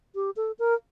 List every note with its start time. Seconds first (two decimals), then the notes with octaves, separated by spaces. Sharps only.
0.15 G4
0.36 A4
0.59 A#4